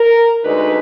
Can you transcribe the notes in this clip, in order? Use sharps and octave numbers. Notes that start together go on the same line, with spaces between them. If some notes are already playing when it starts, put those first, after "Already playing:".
Already playing: A#4
D2 D3 G#3 D#4 B4